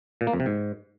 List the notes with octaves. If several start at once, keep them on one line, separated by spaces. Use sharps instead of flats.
A#2
A#3
F2
C3
G#2